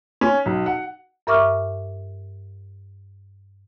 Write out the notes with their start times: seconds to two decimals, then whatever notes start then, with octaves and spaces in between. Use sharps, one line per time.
0.21 C#4
0.46 B1
0.66 F#5
1.27 G2 A#4 E5 C#6 D6 F6